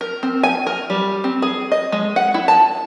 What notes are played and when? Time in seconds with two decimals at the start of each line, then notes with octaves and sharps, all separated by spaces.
0.01 A#4
0.23 C4
0.43 G#5
0.67 A#4
0.90 G3
1.24 C4
1.42 G#4
1.72 D#5
1.92 G#3
2.16 F#5
2.34 E4
2.48 A5